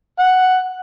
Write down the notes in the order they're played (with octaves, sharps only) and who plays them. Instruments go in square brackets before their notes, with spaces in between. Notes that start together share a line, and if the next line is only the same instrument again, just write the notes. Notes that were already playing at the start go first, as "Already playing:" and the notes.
[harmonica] F#5